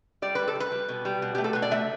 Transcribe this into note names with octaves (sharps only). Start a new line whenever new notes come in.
G3 D5
G3 B4
A4
G3
B4
G3
B2
G3
B2
A3 G4
A4
B2 B4
D5
A3 E5